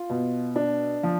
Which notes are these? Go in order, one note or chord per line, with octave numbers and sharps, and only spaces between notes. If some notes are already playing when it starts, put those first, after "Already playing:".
Already playing: F4
B2
D4
F3